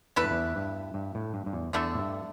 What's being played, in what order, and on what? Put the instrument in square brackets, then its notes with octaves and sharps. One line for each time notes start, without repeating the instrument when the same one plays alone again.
[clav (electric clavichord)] E2 [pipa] A3 E4 B4
[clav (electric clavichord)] G2
E2
G2
G2
A2
G2
G2
E2
[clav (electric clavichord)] E2 [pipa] D3 A3 E4 A4
[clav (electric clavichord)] A2
G2